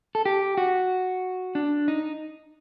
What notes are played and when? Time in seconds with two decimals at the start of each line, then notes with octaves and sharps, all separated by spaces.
0.15 A4
0.25 G4
0.57 F#4
1.55 D4
1.88 D#4